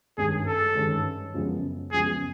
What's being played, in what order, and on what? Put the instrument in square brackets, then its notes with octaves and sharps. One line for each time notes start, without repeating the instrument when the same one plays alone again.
[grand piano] G2 D#3 G#3 C#4 [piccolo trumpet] G#4
[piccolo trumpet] A4
[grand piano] G2 D#3 G#3 C#4
F#2 C#3 F3 G#3 B3
[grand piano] F#2 C#3 F3 G#3 B3 [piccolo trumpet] G#4